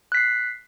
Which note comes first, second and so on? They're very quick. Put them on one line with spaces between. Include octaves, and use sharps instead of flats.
F#6 B6 C7